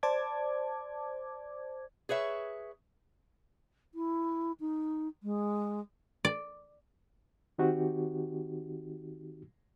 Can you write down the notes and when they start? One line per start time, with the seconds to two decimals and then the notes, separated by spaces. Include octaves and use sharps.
0.03 C5 D5 A5 D6 G#6
2.09 G#4 B4 C#5 E5
3.94 E4
4.60 D#4
5.23 G#3
6.25 D5
7.58 D#3 C4 D#4 F#4 G4